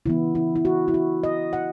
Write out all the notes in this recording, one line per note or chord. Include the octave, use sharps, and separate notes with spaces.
C#3 E3 B3 E4
E4
E4
F#4
E4
F#4
D#5
F#5